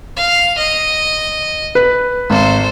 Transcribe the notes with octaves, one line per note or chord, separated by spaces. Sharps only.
F5
D#5
B4
G#1 A4 C5